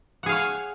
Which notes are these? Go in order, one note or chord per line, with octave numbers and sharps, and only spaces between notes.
G#4 C#5 F5 F#5